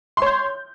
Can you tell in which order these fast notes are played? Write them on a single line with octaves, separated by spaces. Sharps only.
C6 C#5 G6